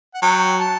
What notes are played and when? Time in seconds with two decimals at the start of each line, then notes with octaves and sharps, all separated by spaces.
0.14 F#5
0.22 F#3 G5
0.59 A5